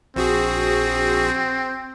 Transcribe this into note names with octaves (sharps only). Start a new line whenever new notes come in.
A#1 C4 F#4 G#4